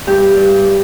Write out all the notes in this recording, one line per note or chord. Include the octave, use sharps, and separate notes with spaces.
G2 G4
G2